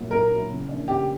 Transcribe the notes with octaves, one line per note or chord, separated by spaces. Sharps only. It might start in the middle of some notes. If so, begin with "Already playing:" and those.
Already playing: A#2 F#3 A#3 E4
A#2 A#4
F#3 A#3 E4
C#3
E3 A#3 D4
C#3 G4